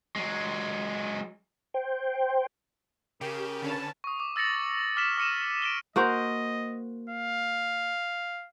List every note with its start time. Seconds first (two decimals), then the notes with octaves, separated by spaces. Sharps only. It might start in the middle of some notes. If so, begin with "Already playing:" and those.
0.16 F#3 G#3
1.74 C5 G5
3.21 C#3 G4 A#4
3.62 D3 C#4 B4 A5
4.04 C#6 D#6
4.20 D6
4.36 E6 A6 A#6 C#7 F#7
4.96 D6 F6 B6 E7
5.18 D6 F6 C#7 D#7 E7
5.62 D7 E7 G7
5.96 A#3 F#4 C5 D#5
7.09 F5